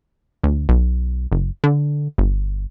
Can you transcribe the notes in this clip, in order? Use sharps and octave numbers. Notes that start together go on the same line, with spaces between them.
D2
B1
F#1
D3
G1